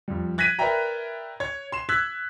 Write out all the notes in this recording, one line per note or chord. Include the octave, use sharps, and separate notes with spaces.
F2 G3
F#6 G#6 A#6 B6 D#7
A#4 B4 D5 E5 G5 A#5
C#5 G#6
C6 E7
E6 F#6 G#6 B6